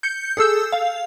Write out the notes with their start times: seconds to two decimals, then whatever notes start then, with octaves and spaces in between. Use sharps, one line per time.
0.03 G6 C#7
0.37 G#4 A4 E6 G6
0.72 F5